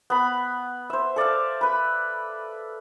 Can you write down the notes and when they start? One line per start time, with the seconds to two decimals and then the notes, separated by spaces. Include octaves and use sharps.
0.10 B3 B5
0.90 C5 E5
1.16 A4 D5 E5 F5
1.61 B4 B5